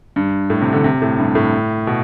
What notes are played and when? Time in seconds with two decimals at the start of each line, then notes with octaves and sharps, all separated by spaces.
0.16 G2
0.50 A2
0.62 C3
0.73 D3
0.84 C3
1.02 A2
1.18 G2
1.35 A2
1.87 B2